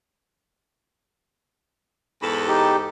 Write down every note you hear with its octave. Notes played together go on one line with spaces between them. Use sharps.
E2 G#2 A4 B5
D#4 G4